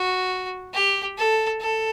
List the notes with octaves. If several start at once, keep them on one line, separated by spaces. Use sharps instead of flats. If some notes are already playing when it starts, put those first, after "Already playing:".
Already playing: F#4
G4
A4
A4